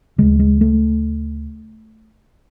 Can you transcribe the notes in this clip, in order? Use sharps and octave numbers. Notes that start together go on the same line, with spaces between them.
D2 C#3 G#3
G#3
A3